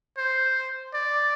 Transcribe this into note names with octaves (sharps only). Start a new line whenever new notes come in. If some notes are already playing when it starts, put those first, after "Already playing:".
C5
D5